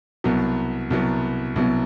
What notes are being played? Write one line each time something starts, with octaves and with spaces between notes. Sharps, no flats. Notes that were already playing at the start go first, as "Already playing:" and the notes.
C2 B2 F#3 B3
C2 B2 F#3 B3
C2 B2 F#3 B3